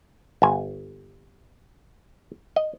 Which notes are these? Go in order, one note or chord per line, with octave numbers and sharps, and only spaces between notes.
G1 G#5
D#5